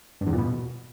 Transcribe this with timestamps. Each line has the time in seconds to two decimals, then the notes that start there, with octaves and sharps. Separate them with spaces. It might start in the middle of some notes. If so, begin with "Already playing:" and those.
0.21 G2
0.27 E2
0.32 A#2
0.38 B2